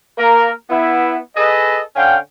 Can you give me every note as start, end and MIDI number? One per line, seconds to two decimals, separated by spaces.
0.18 0.51 58
0.18 0.51 70
0.70 1.19 59
0.70 1.19 64
1.36 1.81 68
1.36 1.81 69
1.36 1.81 71
1.36 1.81 75
1.96 2.17 50
1.96 2.17 61
1.96 2.17 77
1.96 2.17 79